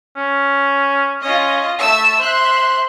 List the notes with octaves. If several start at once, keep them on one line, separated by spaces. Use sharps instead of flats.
C#4
C#4 F4 D#5
A3 E5 A5 E6
C5 E5 C6 F#6